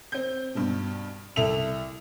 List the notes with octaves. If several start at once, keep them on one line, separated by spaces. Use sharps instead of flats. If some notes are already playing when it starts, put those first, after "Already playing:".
C4 G6
G2 B2
C2 A4 E5 F7